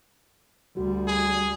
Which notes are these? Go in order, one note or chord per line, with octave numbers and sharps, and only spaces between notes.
D2 G3 F#4
G#4